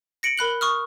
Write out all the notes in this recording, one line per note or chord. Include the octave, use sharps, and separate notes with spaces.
A#6 C#7 D7 F#7
A#4 B5 F#6 F#7
C#6 D#6 F6